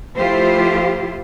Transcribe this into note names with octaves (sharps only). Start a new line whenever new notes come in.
F3 A3 E4 F4 G4 C5